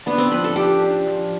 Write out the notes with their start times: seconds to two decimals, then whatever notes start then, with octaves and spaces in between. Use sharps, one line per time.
0.06 B3 D4
0.18 C4
0.31 F3 B4
0.44 A4
0.56 D4 G4
0.82 D4
1.07 F3